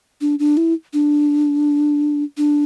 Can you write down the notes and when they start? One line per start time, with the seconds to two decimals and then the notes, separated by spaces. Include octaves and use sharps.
0.21 D4
0.39 D4
0.57 E4
0.93 D4
2.37 D4